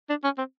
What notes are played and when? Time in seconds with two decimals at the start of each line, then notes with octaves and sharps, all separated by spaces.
0.09 D4
0.24 C#4
0.38 C4